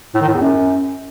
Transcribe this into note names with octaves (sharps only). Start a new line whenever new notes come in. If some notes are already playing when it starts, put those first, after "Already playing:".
A2
D#3
A2
E2
F#2